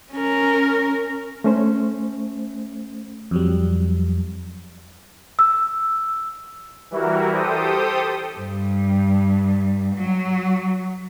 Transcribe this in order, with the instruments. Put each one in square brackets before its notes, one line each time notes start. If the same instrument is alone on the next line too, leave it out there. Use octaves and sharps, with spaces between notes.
[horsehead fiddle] C#4 A#4
[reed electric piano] A3 C#4 C5
[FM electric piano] F2 F#3 G3
[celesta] E6
[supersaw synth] E3 G3 E4 F#4 A#4
G4 A4 C5 G5 D#6
[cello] G2
F#3